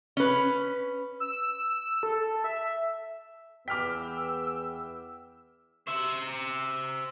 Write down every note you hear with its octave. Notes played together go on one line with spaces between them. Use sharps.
C#4 B4
E6
A4
E5
E2 B3 G5 D6 E6 F6 B6
C5 E5